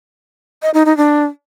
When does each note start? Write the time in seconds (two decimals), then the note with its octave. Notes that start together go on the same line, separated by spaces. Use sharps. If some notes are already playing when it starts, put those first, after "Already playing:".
0.62 D#5
0.74 D#4
0.86 D#4
0.97 D4